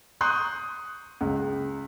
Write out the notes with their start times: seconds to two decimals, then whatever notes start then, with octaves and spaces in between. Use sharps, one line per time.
0.21 C6 C#6 D#6 F#6 G6
1.21 C#2